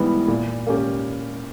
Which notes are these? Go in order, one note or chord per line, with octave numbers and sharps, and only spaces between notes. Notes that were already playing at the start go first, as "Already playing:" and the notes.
Already playing: G#2 E3 G3 B3
A#2
A#3 C#4 G4